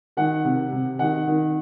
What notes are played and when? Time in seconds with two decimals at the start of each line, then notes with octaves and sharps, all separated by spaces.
0.17 D#3 F#5
0.45 C3
0.72 C3
0.99 D#3 F#5
1.27 D#3